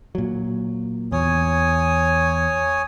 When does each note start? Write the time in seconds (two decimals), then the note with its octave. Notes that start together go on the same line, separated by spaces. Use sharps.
0.15 A#2 F#3
1.12 E2 C#5 G#5 D#6